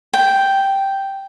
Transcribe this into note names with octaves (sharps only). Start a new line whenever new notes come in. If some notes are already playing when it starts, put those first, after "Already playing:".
G5